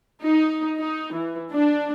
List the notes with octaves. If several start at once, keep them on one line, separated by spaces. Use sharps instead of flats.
D#4
D#4
E3
D4